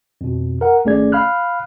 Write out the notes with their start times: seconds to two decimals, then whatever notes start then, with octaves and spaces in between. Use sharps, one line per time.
0.21 F2 B2
0.61 A#4 F#5
0.85 G#1 A3 C#4 G#4 D5 G#6
1.12 F5 B5 F6 F#6